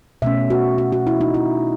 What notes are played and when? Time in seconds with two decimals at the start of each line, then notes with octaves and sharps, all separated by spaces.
0.22 B2 A3 C#4 E5
0.50 F#4
0.78 F#4
0.92 F#4
1.07 E4
1.21 D#4
1.34 E4